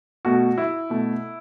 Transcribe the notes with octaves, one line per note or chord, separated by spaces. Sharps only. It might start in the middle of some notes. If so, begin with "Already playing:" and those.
B2 A3 F#4
E4
B2 A3